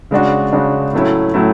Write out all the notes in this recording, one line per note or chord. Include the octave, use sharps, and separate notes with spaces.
C#3 G#3 D4 F#4
C#3 G#3 D4 F#4
A2 F#3 A3 C#4 E4
A2 F#3 A3 C#4 E4